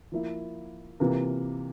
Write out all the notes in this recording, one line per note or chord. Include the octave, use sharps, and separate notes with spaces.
F3 A#3 E4
C3 E3 A#3 F4 A#4